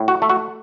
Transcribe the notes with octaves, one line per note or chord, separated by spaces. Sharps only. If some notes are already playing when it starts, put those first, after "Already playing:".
Already playing: A2
F#4
A3
F#4